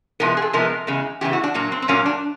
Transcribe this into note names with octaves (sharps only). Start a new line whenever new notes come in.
C3 F3 G#3 B3 A#4
G#4
A4
C3 F3 G#3 B3 A#4
E2 C#3 G#3
E2 C#3 E3 G#3 G4
F#4
D4
A#2 F#3 A#3
C4
C4
A#2 F#3 A#3 C#4
D4